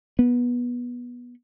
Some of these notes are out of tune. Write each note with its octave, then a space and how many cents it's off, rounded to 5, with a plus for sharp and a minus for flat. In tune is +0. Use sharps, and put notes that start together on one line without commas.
B3 -20